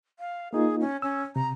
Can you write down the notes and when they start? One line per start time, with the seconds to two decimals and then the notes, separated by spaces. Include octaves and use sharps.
0.19 F5
0.53 A#3 D#4 F4 G#4
0.80 C#4
1.02 C#4 E6
1.36 C3 A#5